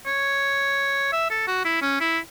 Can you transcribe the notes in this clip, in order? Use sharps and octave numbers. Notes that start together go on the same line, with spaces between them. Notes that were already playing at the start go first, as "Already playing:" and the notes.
C#5
E5
A4
F#4
E4
C#4
E4